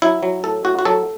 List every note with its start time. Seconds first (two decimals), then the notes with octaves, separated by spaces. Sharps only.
0.02 F#3 E4
0.23 F#3
0.44 A2 A4
0.65 A2 F#4
0.79 F#4
0.85 F#3 A4